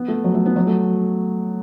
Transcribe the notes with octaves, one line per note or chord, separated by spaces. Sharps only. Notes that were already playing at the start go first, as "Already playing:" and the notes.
Already playing: B3
A3
F#3
A3
B3
F#3
A3